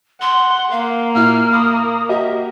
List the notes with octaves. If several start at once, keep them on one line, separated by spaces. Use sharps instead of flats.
F#5 C6
A#3 F5
A#2 E4 F6
B5 D#6
F#4 G4 D#5 E5